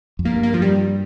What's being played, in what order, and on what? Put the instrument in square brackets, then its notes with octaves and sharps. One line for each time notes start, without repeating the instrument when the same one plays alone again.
[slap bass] F2
[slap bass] G2 [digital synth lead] A#3
[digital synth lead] A#3
F3
G3